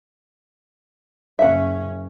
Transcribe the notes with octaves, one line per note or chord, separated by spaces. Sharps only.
F#1 C#4 E5 F#5